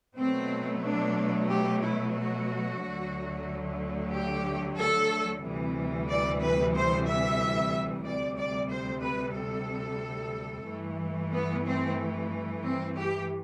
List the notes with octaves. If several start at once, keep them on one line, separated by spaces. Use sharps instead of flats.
B2 F#3 A3 C4
D4
G4
E4
F#4
D2 D3 F#3 A3
G4
A4
D2 C3 E3 G3
D5
B4
C5
E5
D2 C3 G3 D5
D5
C5
B4
A4
G2 E3 A3
B3
C4
C4
G4